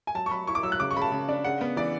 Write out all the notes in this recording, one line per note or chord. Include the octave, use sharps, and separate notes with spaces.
G#5
F#3 A5
C#6
F#3 B5
E4 C#6
D6
F#3 E6
F#6
C#3 D6
C#6
C#3 B5
A5
C#3
D4
C#3 F#5
B3
E3 D5